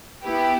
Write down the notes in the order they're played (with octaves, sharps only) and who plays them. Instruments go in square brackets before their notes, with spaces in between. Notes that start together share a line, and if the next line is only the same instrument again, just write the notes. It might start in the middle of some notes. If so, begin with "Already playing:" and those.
[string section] B3 E4 G4 B4